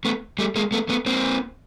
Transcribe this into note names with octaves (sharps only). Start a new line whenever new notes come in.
A3 B3
G3 A3
G#3 A#3
A3 B3
A3 B3
A#3 C4